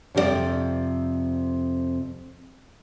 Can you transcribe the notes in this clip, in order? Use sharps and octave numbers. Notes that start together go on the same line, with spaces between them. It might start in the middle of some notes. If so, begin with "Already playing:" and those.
F2 C3 G4 D5 G5